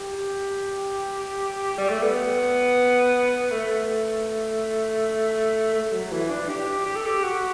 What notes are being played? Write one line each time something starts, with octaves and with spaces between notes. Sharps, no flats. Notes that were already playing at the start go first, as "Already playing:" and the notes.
Already playing: G4
G3
A3
B3
A3
A3
F#3
E3
D4
G4
G4
A4
G4
F#4